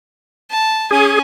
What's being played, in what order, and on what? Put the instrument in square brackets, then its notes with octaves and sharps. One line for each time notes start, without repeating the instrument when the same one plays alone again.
[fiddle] A5
[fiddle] C#4 G#5 [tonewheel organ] G#4